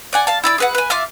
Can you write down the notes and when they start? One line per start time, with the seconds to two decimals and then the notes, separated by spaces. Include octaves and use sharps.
0.13 D5 F#5 G#5
0.27 F5 A5
0.44 E4 D5 E6
0.58 G#4 B4 F#5
0.75 B4 G#5
0.90 F4 E5 D6 F6